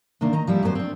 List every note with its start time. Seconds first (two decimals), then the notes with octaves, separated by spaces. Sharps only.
0.21 C3 D#3 A#3 D4
0.33 D#3 D#5 A#5
0.47 F3 G3 E4
0.63 F#2 F#3 B3 A4 C5
0.75 C4 D4